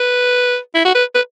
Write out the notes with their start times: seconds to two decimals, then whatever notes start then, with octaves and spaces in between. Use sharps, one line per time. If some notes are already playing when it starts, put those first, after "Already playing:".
Already playing: B4
0.75 E4
0.85 F#4
0.95 B4
1.15 B4